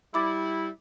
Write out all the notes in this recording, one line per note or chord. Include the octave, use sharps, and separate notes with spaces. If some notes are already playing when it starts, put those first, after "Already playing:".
G3 E4 B5 D6 A6